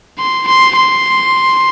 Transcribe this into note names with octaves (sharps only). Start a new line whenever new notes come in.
C6
C6
C6